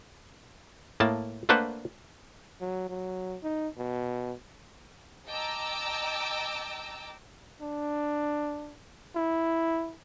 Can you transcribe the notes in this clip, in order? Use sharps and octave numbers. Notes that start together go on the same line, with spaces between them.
A2 A#3 A5
A3 A#3 D4 B4 C5 F#5
F#3
F#3
D#4
B2
D#5 G5 A5 A#5 D6 E6
D4
E4